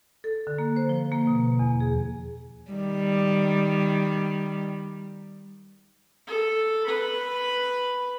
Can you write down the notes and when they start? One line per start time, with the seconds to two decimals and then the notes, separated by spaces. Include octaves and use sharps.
0.24 A4
0.47 D3
0.58 A#3
0.76 C5
0.89 F3
1.12 A#3
1.27 B2
1.59 E2
1.80 G#4
2.71 D#3 G3
6.27 A4
6.85 B4 B5